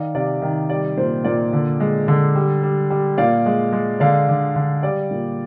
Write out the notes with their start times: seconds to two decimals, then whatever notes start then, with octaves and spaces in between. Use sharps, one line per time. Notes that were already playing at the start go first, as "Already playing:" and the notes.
Already playing: D#3 D5 F5
0.15 C3 D5 F5
0.42 D#3
0.70 G3 D5
0.98 A#2 C5
1.24 A#2 D5
1.53 D3
1.80 G#3
2.08 D3
2.36 G3
2.63 G3
2.90 G3
3.18 A#2 D5 F5
3.46 G#3
3.73 G#3
4.00 D3 D5 F5
4.29 D3
4.56 D3
4.83 G3 D5
5.11 A#2